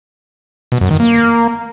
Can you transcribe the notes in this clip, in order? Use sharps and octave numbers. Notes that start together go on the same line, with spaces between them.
B2
F#2
D#3
A#3